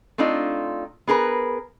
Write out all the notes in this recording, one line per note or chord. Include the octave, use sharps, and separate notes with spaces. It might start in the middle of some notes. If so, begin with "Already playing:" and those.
A3 C4 D4 D#4 F4
B3 G#4 A#4 B4